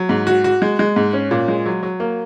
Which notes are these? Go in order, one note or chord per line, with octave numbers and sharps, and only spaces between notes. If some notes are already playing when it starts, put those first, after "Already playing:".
Already playing: F#3
G#2
F#4
F#4
G#3
G#3
G#2
C#4
A#2
G#3
F#3
F#3
A#3